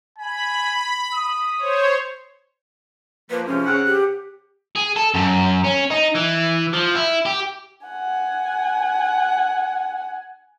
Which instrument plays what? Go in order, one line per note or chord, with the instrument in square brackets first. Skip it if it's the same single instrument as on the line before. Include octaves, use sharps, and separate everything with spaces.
[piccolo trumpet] G#5 [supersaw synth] B5
[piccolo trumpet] D#6
[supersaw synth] C5 C#5
[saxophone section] F3 A#3 [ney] B4
[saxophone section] G#2 C3 F3 [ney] C#4
[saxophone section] C#3 C4 F#5
[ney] G4
[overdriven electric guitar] G#4
A4
F#2
C#4
D#4
E3
F3
E4
G4
[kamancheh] F#5 G#5